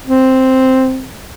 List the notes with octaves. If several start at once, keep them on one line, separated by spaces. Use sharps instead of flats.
C4